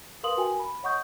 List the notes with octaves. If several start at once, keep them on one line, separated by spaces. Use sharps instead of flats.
A#4 B4 F5 C6 D#6 F#7
F#4 A#4 G5 G#5
B5
C#5 D#5 F#5 C#6 D#6 G6